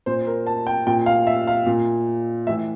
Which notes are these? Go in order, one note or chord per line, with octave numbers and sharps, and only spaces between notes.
A#2 C5
A#4
A5
G5
A#2 G5
F5
E5
F5
A#2
A2 E3 E5